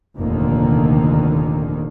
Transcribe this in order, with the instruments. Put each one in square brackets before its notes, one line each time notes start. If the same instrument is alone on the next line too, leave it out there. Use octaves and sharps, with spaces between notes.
[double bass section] F1 D#2 A#2 D3 D#3 A#3